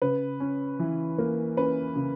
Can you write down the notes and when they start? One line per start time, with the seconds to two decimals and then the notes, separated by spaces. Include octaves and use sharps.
0.02 C#3 B4
0.40 C#4
0.79 E3
1.18 A#3
1.57 C#4 B4
1.95 C#3